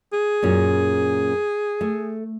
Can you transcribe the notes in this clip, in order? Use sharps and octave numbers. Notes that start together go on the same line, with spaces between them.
G#4
F#2 A#2 C#4
A3